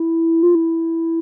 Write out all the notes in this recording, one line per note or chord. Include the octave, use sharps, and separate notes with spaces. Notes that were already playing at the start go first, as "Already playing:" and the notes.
Already playing: E4
F4
E4